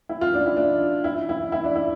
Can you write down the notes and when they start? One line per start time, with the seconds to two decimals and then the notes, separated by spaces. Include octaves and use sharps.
0.09 E4
0.21 F4
0.34 D4
0.46 E4
0.57 D4
1.04 E4
1.29 E4
1.52 E4
1.64 D4
1.76 E4